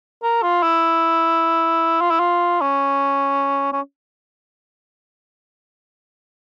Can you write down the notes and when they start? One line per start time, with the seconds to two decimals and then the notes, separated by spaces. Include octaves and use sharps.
0.23 A#4
0.43 F4
0.63 E4
2.01 F4
2.11 E4
2.20 F4
2.61 C#4
3.73 C#4